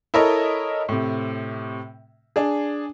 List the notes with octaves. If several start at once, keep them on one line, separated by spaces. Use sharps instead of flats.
E4 A4 A#4 C#5 D#5
A2 C3
D4 G#4